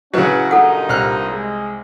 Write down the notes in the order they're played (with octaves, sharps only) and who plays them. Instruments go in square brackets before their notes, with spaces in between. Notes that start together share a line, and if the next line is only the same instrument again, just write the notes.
[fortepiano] C#3 F#3 [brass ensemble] C#4 E4 F#4 [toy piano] B4 D#5
[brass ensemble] G2 A#2 D#4 [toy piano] A4 F#5
[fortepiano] C2 F6 F#6
[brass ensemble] G#3